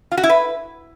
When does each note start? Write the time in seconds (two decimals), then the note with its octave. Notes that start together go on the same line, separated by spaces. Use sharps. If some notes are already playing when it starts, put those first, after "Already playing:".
0.12 F4
0.18 F#4
0.23 E4
0.29 B4